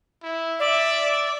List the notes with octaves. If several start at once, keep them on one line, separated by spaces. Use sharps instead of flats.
E4
D5 E5